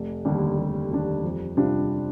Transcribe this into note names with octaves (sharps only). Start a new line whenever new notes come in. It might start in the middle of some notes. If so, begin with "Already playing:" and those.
Already playing: F1
D#2 D3 G3 D4
F1
D#2 D3 G3 D4
F2
C3 G3 D4 F4